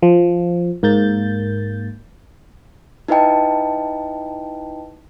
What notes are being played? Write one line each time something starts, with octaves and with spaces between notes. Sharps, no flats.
F3
G#2 A#3 G6 A6
D#4 E4 B4 D#5 G5 A5